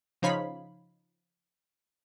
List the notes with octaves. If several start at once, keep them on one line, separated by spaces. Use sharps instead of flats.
C#3 F3 D#4 C#5 F5 B5